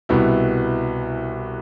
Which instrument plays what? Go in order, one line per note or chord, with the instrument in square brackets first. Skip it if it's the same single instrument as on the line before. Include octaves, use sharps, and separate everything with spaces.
[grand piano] C2 B2 B3 E4